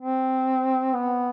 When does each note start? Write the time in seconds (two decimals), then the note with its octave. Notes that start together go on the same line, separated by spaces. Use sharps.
0.01 C4
0.94 B3